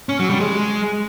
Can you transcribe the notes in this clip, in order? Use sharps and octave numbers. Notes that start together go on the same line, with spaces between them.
C#4
F#3
G3
G#3